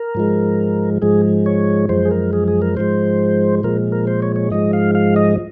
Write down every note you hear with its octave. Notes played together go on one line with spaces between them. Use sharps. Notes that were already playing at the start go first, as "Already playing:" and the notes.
Already playing: A#4
G#2 F3 G#3
G#2 F3 G#3 G#4
C#5
F#2 F3 G#3 C5
G#4
A#4
G#4
G#4
A#4
G#2 F3 G#3 C5
A#2 F3 G#3 A#4
A#4
C5
C#5
C#5
G#2 F3 G#3 D#5
F5
F5
D#5